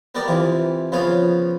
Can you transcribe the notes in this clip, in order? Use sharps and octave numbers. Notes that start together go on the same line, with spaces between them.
B3 G4 A#4 D5 G5
C3 E3 F4
C#3 F3 B3 F4 C#5 F5